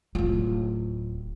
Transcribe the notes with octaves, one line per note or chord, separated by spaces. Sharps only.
D1 F4